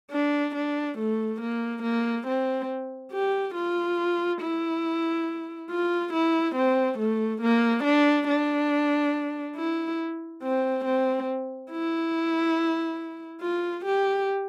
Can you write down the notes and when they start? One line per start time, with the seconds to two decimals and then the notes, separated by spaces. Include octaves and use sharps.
0.12 D4
0.55 D4
0.98 A3
1.41 A#3
1.83 A#3
2.27 C4
3.13 G4
3.55 F4
4.42 E4
5.70 F4
6.13 E4
6.56 C4
6.99 A3
7.41 A#3
7.84 D4
8.28 D4
9.56 E4
10.43 C4
10.85 C4
11.70 E4
13.42 F4
13.85 G4